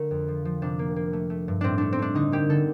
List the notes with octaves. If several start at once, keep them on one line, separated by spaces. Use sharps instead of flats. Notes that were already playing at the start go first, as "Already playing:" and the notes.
Already playing: D3 A3 A#4
F2
F3
F3
C3 D4
A#3
A#3
A3
A3
G2
A2 C4 D4
A3 D4
C4
A3 D4
D3 D#4
A#3 G4
D3 A4